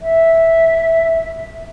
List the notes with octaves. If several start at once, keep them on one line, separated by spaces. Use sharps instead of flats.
E5